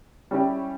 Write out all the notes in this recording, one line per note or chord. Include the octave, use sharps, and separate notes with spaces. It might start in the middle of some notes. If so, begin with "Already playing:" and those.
G3 C#4 E4 G4